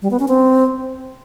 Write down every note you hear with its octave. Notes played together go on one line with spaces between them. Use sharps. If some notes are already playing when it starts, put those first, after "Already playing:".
G3
B3
C#4
C4